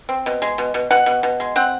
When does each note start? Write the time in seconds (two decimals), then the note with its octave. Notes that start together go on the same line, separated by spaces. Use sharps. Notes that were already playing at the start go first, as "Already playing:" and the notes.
0.09 C4
0.26 B2
0.42 G#3
0.58 B2
0.74 B2
0.91 B2 F#5
1.06 B2
1.23 B2
1.40 G#3
1.56 C4 F#5